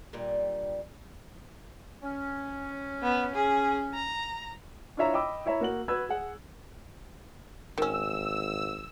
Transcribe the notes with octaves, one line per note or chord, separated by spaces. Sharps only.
G2 A#2 G3
C#4
B3
G#4
A#5
D4 E4 F4 C#5 E5 A#5
D#5 G5 B5 D6 E6
E4 C#5 E5 A#5 B5
A#3 F#4 F#7
F#4 B4 E6 G#6
G#4 F#5
G#1 D#3 C#4 E6